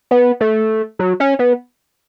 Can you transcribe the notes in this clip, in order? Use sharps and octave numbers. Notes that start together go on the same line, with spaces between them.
B3
A3
F#3
C#4
B3